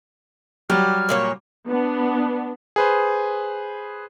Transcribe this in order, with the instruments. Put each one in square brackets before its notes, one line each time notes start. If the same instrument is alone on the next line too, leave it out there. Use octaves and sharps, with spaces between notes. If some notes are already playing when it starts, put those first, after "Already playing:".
[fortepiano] F#3 G3 [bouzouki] G4 [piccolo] F6
[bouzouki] A#2 A#3 C#5
[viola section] B3 D4
[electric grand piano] G#4 B4 C5